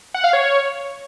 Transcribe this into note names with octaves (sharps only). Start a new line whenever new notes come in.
F#5
F5
C#5